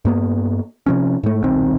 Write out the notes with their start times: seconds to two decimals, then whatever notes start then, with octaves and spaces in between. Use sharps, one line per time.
0.05 G2 A#3 B3
0.86 C3 F3 C#4
1.23 G#2 A3
1.43 D#1 B1 D#3 C4